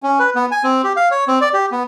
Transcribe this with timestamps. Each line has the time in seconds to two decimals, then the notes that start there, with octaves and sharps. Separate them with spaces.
0.03 C#4
0.19 B4
0.35 B3
0.51 G#5
0.64 C4
0.84 G4
0.96 F5
1.11 C#5
1.28 C4
1.41 D5
1.54 G4
1.72 B3